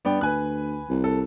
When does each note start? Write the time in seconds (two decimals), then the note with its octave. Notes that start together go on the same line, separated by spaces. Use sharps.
0.05 G2 B3 D5 G5
0.21 D2 B4 G#5 F#6
0.89 C2
1.04 A4